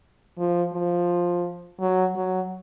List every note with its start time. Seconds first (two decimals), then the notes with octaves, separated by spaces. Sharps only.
0.39 F3
0.73 F3
1.80 F#3
2.16 F#3